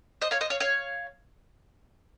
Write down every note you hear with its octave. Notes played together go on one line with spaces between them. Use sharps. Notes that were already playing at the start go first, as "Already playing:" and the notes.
C5 D#5
C#5 F5
C5 D#5
C#5 F5
C#5 F5